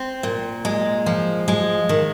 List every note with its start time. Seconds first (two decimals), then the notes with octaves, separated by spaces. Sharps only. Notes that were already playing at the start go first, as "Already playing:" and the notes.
Already playing: C4
0.23 A#2
0.65 G#3
1.06 F3
1.48 G#3
1.89 D#3